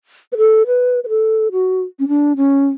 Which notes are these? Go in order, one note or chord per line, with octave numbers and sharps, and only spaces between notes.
B4
A4
B4
B4
A4
F#4
C#4
D4
C#4